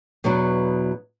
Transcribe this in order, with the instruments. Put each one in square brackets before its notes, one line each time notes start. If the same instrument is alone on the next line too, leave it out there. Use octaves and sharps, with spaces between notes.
[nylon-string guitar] E2 B2 F#3 B3 D4